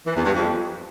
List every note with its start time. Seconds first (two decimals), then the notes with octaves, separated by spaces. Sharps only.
0.07 E3
0.16 E2
0.25 G2
0.34 F2